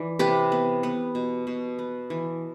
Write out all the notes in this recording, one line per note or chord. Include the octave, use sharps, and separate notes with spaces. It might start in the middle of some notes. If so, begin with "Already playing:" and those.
Already playing: E3 D5
C3 G4 B4
B3
B3
B2
B2
B3
E3